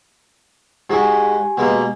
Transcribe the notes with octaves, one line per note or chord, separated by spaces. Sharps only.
G#2 G#3 F#4 G4 G#5
B2 G#3 A#3